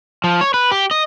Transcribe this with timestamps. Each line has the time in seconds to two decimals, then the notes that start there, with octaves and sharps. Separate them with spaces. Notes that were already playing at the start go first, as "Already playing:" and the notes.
0.24 F3
0.41 C#5
0.54 B4
0.71 G4
0.91 D#5